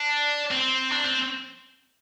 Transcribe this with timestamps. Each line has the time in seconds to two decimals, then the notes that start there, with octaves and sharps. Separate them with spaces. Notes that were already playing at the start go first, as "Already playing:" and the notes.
Already playing: D4
0.51 C4
0.92 D4
1.06 C4